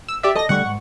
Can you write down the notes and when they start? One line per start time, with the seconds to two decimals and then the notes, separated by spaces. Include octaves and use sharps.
0.09 E6
0.23 G4 D5 E5
0.36 A4 D5 D#5 A5 A#6
0.49 D3 G3 A3 F#5 C#6
0.65 G#2